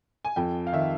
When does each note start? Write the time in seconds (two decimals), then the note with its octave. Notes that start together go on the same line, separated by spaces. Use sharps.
0.25 G#5
0.36 F2 G5
0.67 F5
0.73 D#3 E5